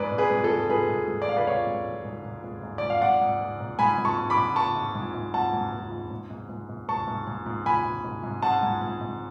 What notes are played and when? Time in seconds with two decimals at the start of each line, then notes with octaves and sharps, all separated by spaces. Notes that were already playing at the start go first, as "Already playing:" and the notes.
Already playing: G#2 B4 D5
0.11 G#2
0.18 G#4 B4
0.31 G#2
0.44 A4
0.50 G#2
0.69 G#2 G#4 B4
0.89 G#2
1.08 G#2
1.22 D5
1.28 G#2 F5
1.37 B4 D5
1.47 G#2 C#5 F5
1.67 G#2
1.85 G#2
2.05 G#2
2.25 G#2
2.44 G#2
2.63 G#2
2.78 G#2 D5
2.90 F5
3.02 G#2 D5 F#5
3.21 G#2
3.41 G#2
3.60 G#2
3.79 G#2 G#5 B5
3.98 G#2
4.05 A5 C#6
4.18 G#2
4.30 B5 D6
4.37 G#2
4.56 G#2 A5 C#6
4.76 G#2
4.95 G#2
5.14 G#2
5.34 G#2 F#5 A5
5.53 G#2
5.72 G#2
5.92 G#2
6.11 G#2
6.30 G#2
6.49 G#2
6.69 G#2
6.89 G#2 A5 C#6
7.08 G#2
7.27 G#2
7.46 G#2
7.66 G#2 G#5 B5
7.85 G#2
8.04 G#2
8.24 G#2
8.42 G#2 F#5 A5
8.63 G#2
8.81 G#2
9.01 G#2